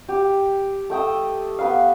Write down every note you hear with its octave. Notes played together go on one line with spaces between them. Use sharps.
G4
A3 G5 D#6 E6
B3 B4 F5